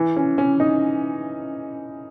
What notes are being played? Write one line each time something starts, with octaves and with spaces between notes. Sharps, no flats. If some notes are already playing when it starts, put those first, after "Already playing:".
Already playing: E3
C#4
C#4
D#4